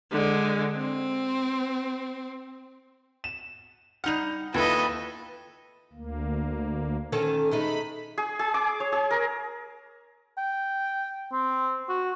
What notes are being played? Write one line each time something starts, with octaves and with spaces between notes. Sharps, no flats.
D3 G#3
C4
E7
G3 D#4 F#5 F6 F7
D#2 A3 E4 F4 A4 B4 D#5
D2 A#3
D#3 C#4 A4
G#3 A3 D#4 B5
G#4
G#4
D6
C#5
G#4
A#4
G5
C4
F#4